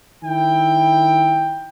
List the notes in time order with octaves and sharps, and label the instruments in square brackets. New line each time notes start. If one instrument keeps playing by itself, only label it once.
[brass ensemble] D#3 E4 G5